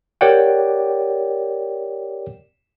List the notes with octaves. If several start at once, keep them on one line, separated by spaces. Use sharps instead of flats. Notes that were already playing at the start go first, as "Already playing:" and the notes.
G4 A#4 C#5 D5 F#5 G5